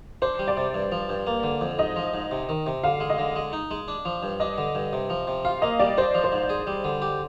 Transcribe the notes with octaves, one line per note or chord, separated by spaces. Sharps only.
D4 C5
G3
D5
C3
G2
F3
G2
A#3
D3
F2
G#2 D#5
F3
G#2
C3
D#3
C3
D3 F5
G#3
D#5
D3
G#3
D#4
G#3
D4
F3
G2
D4 D#5
D3
G2
C3
F3
C3
F4 F5
A#3 D#5
G3 D5
D4 C5
F3
C5
G#2
G#4
G3
D3
G4